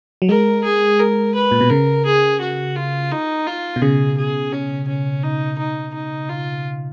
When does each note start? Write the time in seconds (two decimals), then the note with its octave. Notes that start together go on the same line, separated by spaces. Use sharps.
0.22 F#3
0.29 G#3 A#4
0.64 G#4
1.00 A#4
1.35 B4
1.52 A#2
1.61 B2
1.70 C#3 A#4
2.06 G#4
2.41 F#4
2.76 F4
3.12 D#4
3.47 F4
3.76 B2
3.82 C#3 G#4
4.18 G#4
4.53 C#4
4.88 C#4
5.23 D#4
5.59 D#4
5.94 D#4
6.29 F4